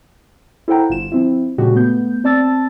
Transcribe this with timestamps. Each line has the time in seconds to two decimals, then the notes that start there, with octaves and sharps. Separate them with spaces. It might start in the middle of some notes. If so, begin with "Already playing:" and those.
0.68 E4 A4 C5 F#5 G5 A#5
0.90 G1 F4 E7
1.12 F3 C4 E4
1.58 A#2 C#3 F3 G#3 F#4 G4
1.75 A3 B3 G6
2.24 C4 D5 A5 E6 A6